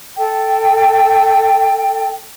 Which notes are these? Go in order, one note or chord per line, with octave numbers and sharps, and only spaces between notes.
A4 G5